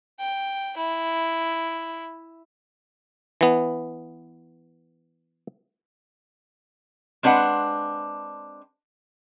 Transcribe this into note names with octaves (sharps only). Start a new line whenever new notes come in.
G5
E4
E3 B3
G#3 C4 D4 B4 F#5